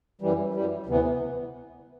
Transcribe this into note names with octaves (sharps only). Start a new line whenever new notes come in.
F#2 E3 G3
F#2 E3 G3
D2 C3 E3 B3